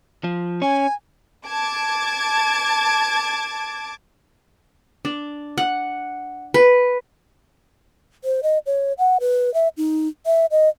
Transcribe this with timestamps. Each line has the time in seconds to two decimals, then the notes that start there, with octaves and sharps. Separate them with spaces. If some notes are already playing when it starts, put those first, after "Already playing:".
0.24 F3
0.62 C#4 G#5
1.45 A5 D6 G#6 A6
5.05 D4
5.58 F#5
6.54 B4
8.24 C5
8.43 D#5
8.66 C#5
8.98 F#5
9.20 B4
9.54 E5
9.77 D#4
10.26 E5
10.51 D#5